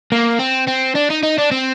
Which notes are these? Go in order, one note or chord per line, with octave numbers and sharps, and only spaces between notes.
A#3
C4
C4
D4
D#4
D#4
D4
C4